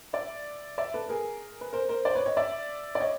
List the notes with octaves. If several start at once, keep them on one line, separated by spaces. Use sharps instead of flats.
D5 E5
D5 E5
A4 B4
G#4 A#4
B4
A#4 C5
A#4 C5
C5 D5
B4 C#5
C#5 D#5
D5 E5
D5
C#5 D#5